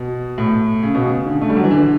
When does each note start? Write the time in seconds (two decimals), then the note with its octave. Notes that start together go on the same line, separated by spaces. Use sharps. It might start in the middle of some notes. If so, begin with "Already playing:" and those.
Already playing: B2
0.38 A2
0.83 C#3
0.95 B2
1.06 C#3
1.26 D3
1.42 A3
1.49 G3
1.56 F#3
1.64 E3
1.71 D3